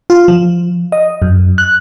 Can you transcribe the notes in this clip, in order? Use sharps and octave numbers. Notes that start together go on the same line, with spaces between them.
F4
F3
D#5
F#2
F#6